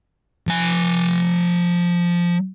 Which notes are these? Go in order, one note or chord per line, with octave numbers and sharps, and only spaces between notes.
F3 G#5